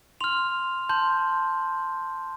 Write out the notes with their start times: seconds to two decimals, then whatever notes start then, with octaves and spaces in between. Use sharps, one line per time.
0.21 C6 F6 F7
0.89 A5 C6 G6